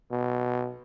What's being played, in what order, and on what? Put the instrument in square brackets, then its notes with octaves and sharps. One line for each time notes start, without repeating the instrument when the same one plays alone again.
[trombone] B2